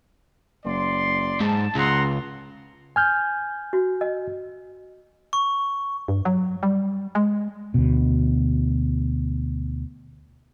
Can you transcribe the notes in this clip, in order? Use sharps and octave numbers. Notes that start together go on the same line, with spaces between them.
F#1 D5 C6
G#2 A5
C#2 C#3 F#5 A#5 C6
G#5 F6 G6
F#4
D#5
C#6
G2
F#3
G3
G#3
D2 B2